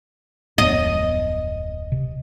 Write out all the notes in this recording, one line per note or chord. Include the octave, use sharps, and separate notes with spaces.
D1 F2 B3 D#5
C3